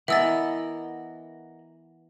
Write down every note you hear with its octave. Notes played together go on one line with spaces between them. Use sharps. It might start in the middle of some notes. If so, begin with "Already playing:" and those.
E3 B3 A#4 D#5 E5 F#5 E6 A6